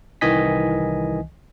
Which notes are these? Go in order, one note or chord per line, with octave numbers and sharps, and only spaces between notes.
C2 D#3 E3 D#5 G#5 B6